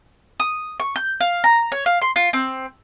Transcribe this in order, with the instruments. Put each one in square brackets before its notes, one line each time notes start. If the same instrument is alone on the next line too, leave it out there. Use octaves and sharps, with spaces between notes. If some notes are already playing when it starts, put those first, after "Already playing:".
[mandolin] D#6
C#6
G6
F5
A#5
C#5
F5
C6
F4
C4